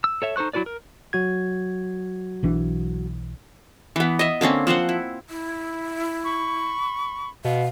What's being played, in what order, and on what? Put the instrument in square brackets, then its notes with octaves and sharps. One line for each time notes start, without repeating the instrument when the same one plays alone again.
[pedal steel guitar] E6
A4 C#5 E5
D#4 A4 C5 C#6 F#6
F#3 E4 F#4 B4 D5
A#4
[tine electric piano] F#3 F#4 G#6
[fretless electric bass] B1 E3 D4
[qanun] E3 B3
D#5 E5
D3 A#3 C4 C#4
F3 C4 C5 F#5
E4
[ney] E4
[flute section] B5 C#6
[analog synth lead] B2 [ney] F5